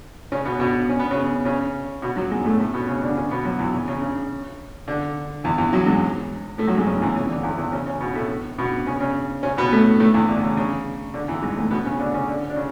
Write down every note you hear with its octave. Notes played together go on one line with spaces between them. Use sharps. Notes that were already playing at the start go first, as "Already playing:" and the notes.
C#3 C#4
B2 B3
B2 B3
C#4
B3
C#3 C#4
C#3 C#4
B2 B3
F#2 F#3
G#2 G#3
A2 A3
A2 A3
B2 B3
C#3 C#4
D3 D4
C#3 C#4
B2 B3
F#2 F#3
E2 E3
C#3
C#3
C#3
D3
E2 E3
E2 E3
F#2 F#3
G#2 G#3
A2 A3
F#2 F#3
G#2 G#3
C#3 C#4
E2 E3
C#3
E3
D3
E2 E3
E2 E3
C#3 C#4
C#3 C#4
B2 B3
A2 A3
B2 B3
C#3 C#4
C#3 C#4
C#3 C#4
B2 B3
A2 A3
A2 A3
E2 E3
D3
C#3
C#3
D3
E2 E3
G#2 G#3
A2 A3
B2 B3
C#3 C#4
D3 D4
C#3 C#4
D3 D4
D4
C#3